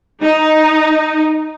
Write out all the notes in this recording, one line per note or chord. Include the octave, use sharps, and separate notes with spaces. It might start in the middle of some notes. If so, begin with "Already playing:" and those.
D#4